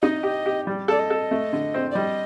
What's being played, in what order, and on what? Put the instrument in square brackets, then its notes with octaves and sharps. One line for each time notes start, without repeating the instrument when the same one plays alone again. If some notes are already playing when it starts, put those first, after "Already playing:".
[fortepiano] D#4 [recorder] D#5
[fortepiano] G4
G4
G3
[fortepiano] A4 [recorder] D5
[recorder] D#5
[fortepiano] A4
A3
D3
C4
[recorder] D5
[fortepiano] G3 [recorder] D#5